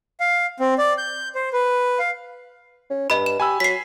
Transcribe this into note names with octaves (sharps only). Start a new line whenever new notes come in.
F5
C4
D5
G6
C5
B4
F5
C#4
G2 D#5 B5
E7
G4 G#5 B5 E6
F#3 B6 C7